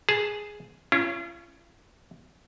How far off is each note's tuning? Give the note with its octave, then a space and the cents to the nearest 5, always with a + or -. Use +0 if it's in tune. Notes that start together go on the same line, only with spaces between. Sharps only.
G#4 +0 A5 +0
C#4 +0 F4 -45